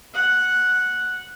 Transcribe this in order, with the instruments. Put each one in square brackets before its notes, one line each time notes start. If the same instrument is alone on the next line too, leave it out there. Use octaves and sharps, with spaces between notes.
[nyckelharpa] F#5